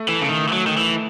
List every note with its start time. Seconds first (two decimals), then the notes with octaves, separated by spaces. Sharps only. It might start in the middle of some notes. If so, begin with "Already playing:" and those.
Already playing: A3
0.08 E3
0.21 C#3
0.28 D#3
0.48 E3
0.53 F#3
0.67 D#3
0.77 E3